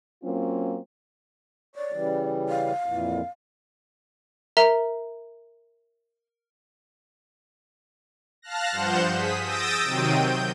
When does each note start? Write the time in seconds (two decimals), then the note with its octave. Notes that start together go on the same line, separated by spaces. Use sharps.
0.23 F#3 A#3 C4 C#4 F4
1.76 C#5 D5
1.92 C#3 E3 G3
2.49 F5
2.86 F2 A#2 E3
4.57 A#4 E5 A#5
8.42 F5 A5 F6 F#6 A#6
8.72 G2 F3 C5 F#5 G6 E7
9.12 G#4 D#6 B6
9.44 D#6 E6 G6 A6 A#6 D7
9.84 C3 D#3 F#3 C4 G5 D#7
10.20 G6